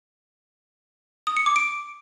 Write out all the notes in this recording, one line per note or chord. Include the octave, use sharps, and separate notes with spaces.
D#6
C#7
D6
D7